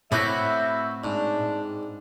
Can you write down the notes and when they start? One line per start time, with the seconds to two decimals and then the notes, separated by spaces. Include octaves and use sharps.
0.12 A2 C4 E4 F#4 B4 E5 D6
1.04 G#2 D4